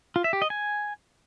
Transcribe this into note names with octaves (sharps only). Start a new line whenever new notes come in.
F4
E5
G4
D#5
G#5